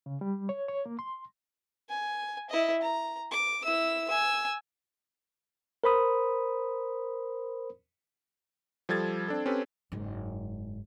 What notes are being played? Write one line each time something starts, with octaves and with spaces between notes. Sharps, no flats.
C#3
G3
C#5
C#5
A#3
C6
G#5
E4 D#5
A#5
D6
E4 E6
G#5 E6
A#4 C5 B5 D#6
F3 G3 A4 G#6 A6
C4 D4 A4
C4 C#4 G4 A4 B4
F#1 G#2